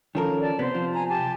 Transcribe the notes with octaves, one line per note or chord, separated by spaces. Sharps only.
D#3 F3 C#4 A4 A#4
D5 A5
C3 B3 C5
F3
G#5 A#5
G4 G#5 A5